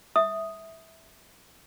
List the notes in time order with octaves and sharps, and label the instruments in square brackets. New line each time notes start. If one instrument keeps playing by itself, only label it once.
[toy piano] E5 D#6